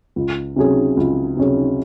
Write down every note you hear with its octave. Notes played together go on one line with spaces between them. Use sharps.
C#2
C3 F#3 C#4 G#4
C#2
C3 F#3 C#4 G#4